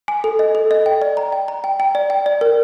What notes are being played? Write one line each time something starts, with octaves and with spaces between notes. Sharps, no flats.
G#5
A4
D#5
A4
D#5
G5
D5
A#5
G5
A#5
G5
G5
D5
G5
D5
A#4